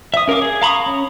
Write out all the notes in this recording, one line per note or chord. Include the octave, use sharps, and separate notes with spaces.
E5 D#6
C#4 A#4 E5 F5 D6
G#4
F5 A#5 B5 C#6 D#6
C#4